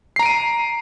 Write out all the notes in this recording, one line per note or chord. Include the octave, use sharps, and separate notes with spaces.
A#5 C7 D7 D#7